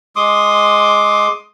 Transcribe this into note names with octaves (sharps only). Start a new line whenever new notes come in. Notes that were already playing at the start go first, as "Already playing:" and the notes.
G#3 C6 D6 D#6